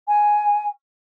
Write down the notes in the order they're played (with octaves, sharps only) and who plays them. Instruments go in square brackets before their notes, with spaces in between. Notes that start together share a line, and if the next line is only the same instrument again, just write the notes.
[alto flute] G#5